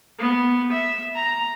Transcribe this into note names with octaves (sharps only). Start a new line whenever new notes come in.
B3
E5
A#5